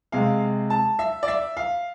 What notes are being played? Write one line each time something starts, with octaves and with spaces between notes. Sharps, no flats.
C3 G#3 F5
A5
E5
D5
E5
F5